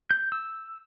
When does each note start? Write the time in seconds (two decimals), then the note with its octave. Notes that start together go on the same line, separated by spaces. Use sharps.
0.11 G6
0.32 E6